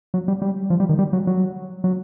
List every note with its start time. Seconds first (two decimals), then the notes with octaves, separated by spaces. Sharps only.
0.14 F#3
0.28 G3
0.42 G3
0.70 F3
0.80 G3
0.89 D#3
0.99 G3
1.13 F#3
1.27 F#3
1.84 F#3